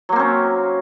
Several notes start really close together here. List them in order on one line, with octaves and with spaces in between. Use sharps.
F#3 A#3 C4 C#4